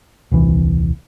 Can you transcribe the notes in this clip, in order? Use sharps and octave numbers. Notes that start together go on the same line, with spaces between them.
D#1 C2 E3